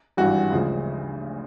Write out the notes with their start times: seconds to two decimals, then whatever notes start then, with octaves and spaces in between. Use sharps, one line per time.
0.17 G#1 G2 E3 G3 F#4
0.51 D2 C#3 F3 G#3